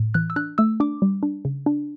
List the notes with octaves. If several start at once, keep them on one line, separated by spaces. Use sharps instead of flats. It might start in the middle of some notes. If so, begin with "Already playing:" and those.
Already playing: A2
E3 F#6
E6
D4 F#6
A3 E6
D4 D6
G3
D4
C#3
D4